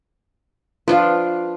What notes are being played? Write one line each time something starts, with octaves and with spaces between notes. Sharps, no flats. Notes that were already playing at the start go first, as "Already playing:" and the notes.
F3 D4 F4 B4 F5